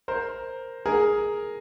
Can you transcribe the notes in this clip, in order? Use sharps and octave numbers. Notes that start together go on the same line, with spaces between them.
A#4 C5
G#4 A#4